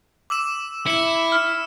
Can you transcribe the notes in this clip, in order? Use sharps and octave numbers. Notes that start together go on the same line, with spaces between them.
D6 E6 E7
E4 C#7 E7
F6